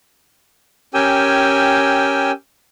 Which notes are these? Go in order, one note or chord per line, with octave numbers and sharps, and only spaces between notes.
C#4 G4 A#4 G5 G#5 E6